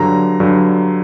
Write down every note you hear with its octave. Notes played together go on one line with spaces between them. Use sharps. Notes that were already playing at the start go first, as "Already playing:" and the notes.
Already playing: G2 D3 F#3 A#5
G2 D3 F#3